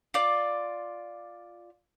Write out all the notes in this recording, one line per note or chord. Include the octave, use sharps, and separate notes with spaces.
F4 D5